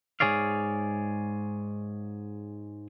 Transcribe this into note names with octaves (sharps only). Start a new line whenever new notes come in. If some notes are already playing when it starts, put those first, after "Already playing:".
G#2 F#3 G#4 C#5 D5 F5